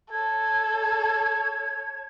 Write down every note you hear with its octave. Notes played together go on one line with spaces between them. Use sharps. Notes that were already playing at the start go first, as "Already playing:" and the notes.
A4 C#5 A5 G#6